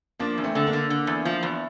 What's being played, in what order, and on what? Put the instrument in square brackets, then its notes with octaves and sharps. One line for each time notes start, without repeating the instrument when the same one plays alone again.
[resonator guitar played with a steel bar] F3 [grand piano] A#3 D4
[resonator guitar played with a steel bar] E2
[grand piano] A3 C4
[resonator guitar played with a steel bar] D3
[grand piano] A#3 D4
[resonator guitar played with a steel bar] D3
D3
E2
F3
E2